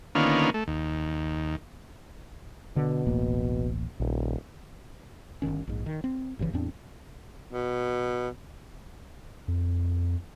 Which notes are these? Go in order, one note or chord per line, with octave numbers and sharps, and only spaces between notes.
D3 D#3 A#3 B3 C#4 F4
A3
D#2
B2 D3
D1 A1 A#3
D#1 A#1
G1 D#2 D#3 C#4
A#1 G#2
D#3
C4
G#1 G2 C#3 E3
E2 A2 C4 D4
B2
F2